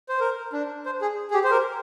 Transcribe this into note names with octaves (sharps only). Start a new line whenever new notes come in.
C5
A#4
D4
C5
G#4
G#4
G4
C5
A#4